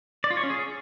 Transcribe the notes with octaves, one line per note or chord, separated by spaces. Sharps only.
D5
F4
C#5
C#4
G#4